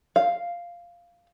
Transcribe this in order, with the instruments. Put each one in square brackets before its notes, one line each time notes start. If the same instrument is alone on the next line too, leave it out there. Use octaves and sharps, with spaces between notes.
[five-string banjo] F5